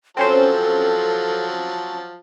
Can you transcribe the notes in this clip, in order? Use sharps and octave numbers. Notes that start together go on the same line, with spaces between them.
F3 F#3 C4 C#4 A4 C5 A5